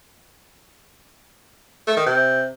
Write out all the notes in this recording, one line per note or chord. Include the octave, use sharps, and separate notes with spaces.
A3
D#3
C3